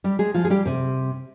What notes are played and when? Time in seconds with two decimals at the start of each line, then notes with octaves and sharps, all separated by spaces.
0.04 G3 G4
0.19 G#3 G#4
0.34 F3 F4
0.45 G#4
0.50 G3 G4
0.66 C3 C4